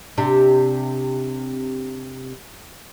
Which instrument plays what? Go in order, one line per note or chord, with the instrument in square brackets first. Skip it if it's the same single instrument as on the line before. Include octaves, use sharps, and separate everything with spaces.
[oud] C3 D4